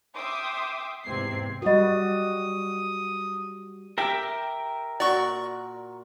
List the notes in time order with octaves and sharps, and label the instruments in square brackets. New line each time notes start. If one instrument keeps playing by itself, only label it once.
[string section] E5 G5 C6 D6 D#6
E2 G#2 C3 C4 G#6 C7
[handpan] G3 F#4 [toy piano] A#4 D#5 [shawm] D#6
[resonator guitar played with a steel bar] G4 [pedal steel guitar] A#4 E5 G5
[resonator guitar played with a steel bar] A#2 F#4 [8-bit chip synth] D5 C#6